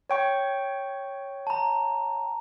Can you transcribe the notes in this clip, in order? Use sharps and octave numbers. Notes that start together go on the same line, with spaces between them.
C#5 G5 C#6
A5 A#5